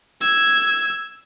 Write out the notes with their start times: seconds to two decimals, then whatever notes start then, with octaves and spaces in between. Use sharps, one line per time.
0.21 E6 G#6